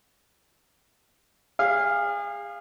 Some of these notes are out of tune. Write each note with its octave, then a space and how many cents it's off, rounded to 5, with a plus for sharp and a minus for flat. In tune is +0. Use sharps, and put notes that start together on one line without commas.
G#4 -35 F5 +0